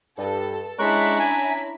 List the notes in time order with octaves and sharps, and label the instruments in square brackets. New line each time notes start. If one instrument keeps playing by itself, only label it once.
[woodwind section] G2 [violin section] A4
[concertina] G#3 C#6 F#6 [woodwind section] C#4 A#5 [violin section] D4 E4 B6
[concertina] G#5